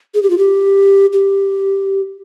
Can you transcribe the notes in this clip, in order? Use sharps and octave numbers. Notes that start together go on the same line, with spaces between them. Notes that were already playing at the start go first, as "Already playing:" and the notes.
G#4
G4
F4
G4
G4